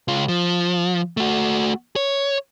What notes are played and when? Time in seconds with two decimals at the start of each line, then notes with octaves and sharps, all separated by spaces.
0.08 C#2 F4
0.28 F3
1.17 A3 F#4
1.96 C#5